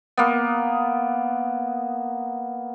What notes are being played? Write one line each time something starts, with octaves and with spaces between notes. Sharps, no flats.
A#3 B3